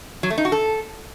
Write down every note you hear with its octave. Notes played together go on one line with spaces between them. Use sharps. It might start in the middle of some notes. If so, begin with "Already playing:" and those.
F#3
A3
D#4
F#4
A4